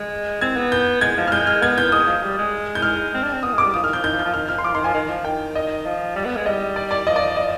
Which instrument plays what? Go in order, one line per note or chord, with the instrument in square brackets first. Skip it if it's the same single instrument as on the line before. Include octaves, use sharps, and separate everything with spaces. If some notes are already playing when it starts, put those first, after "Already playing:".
Already playing: [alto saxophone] G#3
[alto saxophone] C4 [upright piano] G#6
[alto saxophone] B3
[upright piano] G6
[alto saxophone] G#3 [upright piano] G#6
[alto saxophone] F3
[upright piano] F6
[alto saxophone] G#3 [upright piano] G6
[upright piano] F6
[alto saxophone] B3 [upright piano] G#6
[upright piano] G6
[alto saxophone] G#3 [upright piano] D#6
[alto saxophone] F3
G3
G#3
[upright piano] G6
[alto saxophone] G#3 [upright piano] F6
[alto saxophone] C4
D4
C4
[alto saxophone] B3 [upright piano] D#6
[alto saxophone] G#3 [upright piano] D6
[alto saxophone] G3
[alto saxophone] F3 [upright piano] D#6
[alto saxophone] D#3 [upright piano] F6
[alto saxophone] F3 [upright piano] G6
[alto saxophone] D#3 [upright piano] G6
[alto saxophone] F3
[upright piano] G6
[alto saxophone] F3
[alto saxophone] D#3 [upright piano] F6
[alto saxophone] F3 [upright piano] F6
[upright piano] C6
[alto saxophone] F3 [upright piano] D6
[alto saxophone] D#3 [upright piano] C6
[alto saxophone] F3 [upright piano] G#5
[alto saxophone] D#3
F3
[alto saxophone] D#3 [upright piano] G5
[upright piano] D#5
[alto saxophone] F3
G3
B3
G#3
[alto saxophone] G3 [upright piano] D#5
[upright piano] D5
D5
[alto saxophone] F3 [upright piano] D#5
[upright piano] D5
D#5